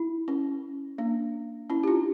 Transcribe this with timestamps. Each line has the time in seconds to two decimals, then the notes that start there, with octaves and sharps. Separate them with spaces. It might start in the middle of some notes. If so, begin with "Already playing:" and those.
Already playing: E4
0.28 C#4
0.98 A#3 D4
1.70 C#4 E4
1.83 G4
1.87 D4 F4